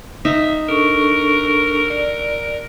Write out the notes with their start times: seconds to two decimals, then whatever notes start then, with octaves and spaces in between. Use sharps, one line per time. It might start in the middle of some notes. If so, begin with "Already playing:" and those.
0.25 D#4 E5
0.69 D4 A4 A#4 C#6
1.90 A#4 D5